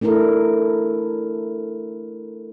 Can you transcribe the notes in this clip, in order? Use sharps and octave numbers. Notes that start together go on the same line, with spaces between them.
A3 D4 E4 A4 A#4